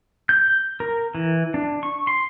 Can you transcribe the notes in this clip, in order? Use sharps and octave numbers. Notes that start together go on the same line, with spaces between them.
G6
A#4
E3
D4
C#6
C6